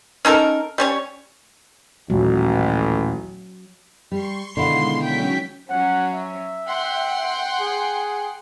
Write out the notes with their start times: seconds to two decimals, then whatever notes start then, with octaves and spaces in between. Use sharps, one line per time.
0.25 C#4 D#4 A4 A#4
0.78 G3 C#4 C#5
2.10 A1 D#2 A#2 F#3 G#3
4.12 G3 C6 C#6 C7
4.57 B2 D3 D#3 G#3 E4 F5 C6
5.03 F#3 C#4 G5 C#6 B6
5.70 F#3 C#4 F#5
6.14 E5
6.68 F#5 G5 C6
7.60 G#4